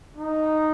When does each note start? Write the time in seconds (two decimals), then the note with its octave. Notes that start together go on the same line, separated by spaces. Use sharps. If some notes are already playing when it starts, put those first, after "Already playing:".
0.17 D#4